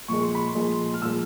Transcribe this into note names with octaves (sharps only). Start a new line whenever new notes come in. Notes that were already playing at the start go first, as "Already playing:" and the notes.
A#2 F3 G#3 C#6
C6
B5
C6
A#2 F3 G#3
F6
A#2 F3 G#3 E6